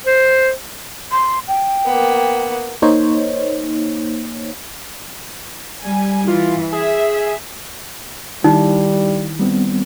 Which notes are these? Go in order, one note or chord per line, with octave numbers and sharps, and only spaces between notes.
C5
C6
G5
A#3 B3
A#3 D#4 C5 C#5
G3 G#5
E3 F4
G#4 E5
D#3 G3 D#4 E4
G3 B3 C4